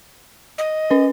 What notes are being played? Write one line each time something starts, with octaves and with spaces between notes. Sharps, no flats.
D#5
C#4 B4